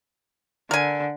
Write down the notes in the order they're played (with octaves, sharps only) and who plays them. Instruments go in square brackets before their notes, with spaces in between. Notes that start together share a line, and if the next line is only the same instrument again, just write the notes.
[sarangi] D3 [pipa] A#4 G#5